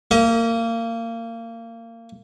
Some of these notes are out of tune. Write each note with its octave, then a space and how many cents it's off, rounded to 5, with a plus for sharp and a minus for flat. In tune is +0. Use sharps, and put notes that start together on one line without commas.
A#3 -25 D#5 +40